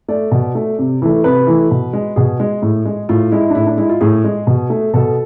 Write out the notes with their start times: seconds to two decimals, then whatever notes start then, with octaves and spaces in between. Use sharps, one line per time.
0.08 A3 D5
0.31 B2
0.55 A3
0.79 C3
1.02 E3 A3
1.24 C3 B4
1.47 E3 A3
1.71 B2
1.93 G#3
2.16 B2 G#4
2.40 G#3
2.62 A2
2.85 G#3
3.09 A2 F4
3.31 G#3 E4
3.50 D4
3.55 A2 E4
3.66 D4
3.78 G#3 E4
3.89 F4
4.01 A2 G#4
4.24 G#3
4.47 B2
4.70 A3
4.94 B2 A4